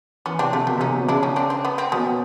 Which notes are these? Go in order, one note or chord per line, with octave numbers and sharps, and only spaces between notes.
E3 B3 C#4
C3 C4 D4
C3 A3
B2 A#3
C3
C#4 D#4
C3
B2
C#3 D4 E4
C#4 D#4
C4 D4
C4
B3
C4
B2 B3 C#4